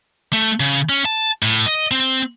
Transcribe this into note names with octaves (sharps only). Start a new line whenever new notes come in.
A3
C#3
C#4
A5
A2
D#5
C4